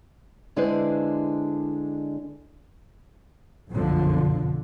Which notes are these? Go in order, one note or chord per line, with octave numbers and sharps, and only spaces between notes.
D3 G#3 D4 E4 B4 C5
F#1 B1 F2 D3 F3